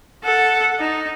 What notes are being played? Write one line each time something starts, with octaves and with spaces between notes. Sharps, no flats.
A4 F#5
D#4